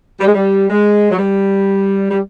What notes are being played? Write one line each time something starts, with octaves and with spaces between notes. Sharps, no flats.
G3
G#3
G3
G#3
F#3
G3
G3